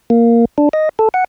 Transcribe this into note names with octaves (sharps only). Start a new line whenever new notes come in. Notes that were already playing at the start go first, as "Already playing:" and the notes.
A#3
D4
D#5
A4
F#5